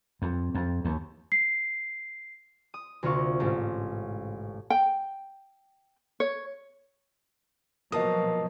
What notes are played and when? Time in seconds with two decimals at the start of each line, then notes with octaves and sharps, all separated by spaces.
0.22 F2
0.55 F2
0.85 D#2
1.32 C7
2.74 D#6
3.03 D2 C3 A#3 F4 F5 C#6
3.40 A1 G#2 C#4
4.70 G5
6.20 C#5
7.92 B2 F3 F#3 A#3 D#5 A5 D#6